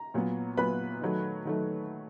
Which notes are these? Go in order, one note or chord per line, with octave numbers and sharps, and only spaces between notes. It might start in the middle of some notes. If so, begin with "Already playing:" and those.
Already playing: A#5
A#2 F#3 B3
A#2 F#3 B3 B4 B5
D#3 F#3 A3
D#3 F#3 A3